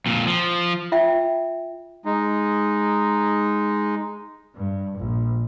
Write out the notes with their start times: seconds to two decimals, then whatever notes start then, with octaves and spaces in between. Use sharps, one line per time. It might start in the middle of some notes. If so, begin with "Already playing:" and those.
0.06 F2 A#2
0.27 F3
0.92 F4 E5 G5
2.05 G#3 D#4
4.56 G2
4.97 A#1